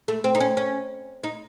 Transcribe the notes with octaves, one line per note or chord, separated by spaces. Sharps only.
A3
C4
D#4
C#4
C#4
D#4